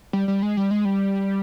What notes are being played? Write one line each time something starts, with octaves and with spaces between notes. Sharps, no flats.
G3
G3
G#3
G3
G#3
G3